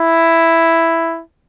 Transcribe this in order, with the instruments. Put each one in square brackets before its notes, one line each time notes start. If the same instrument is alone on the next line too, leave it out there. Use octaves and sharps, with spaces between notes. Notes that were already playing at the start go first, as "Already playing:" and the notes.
Already playing: [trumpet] E4